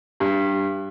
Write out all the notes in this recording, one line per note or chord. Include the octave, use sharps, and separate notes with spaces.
G2